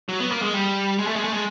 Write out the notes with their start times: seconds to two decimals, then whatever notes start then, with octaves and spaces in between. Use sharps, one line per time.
0.09 F#3
0.20 B3
0.31 A#3
0.42 G#3
0.54 G3
0.99 G#3
1.07 A3
1.16 G#3
1.24 A3
1.33 G#3